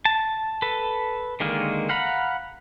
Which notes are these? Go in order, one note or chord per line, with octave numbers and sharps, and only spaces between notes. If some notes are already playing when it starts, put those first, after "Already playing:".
A5
A4 B4
D3 D#3 G#3 A#3
F5 F#5 A#5 B5